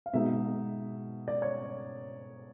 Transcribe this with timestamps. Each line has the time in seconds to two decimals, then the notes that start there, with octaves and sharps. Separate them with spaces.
0.06 F5
0.14 B2 G#3 B3 D#4 E5
1.28 D5
1.42 C#5